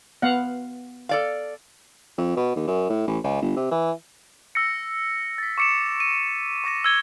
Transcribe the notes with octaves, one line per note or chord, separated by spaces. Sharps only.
B3 F5 F#5
A4 D5 F5
F2
B2
D#2
F#2
A2
A1
C#2
G1
C3
E3
E6 A#6 C#7
A6 B6
C#6 D6 C#7 D7 E7
D#7
C#6 D6 A#6 D#7
E6 G#6 G7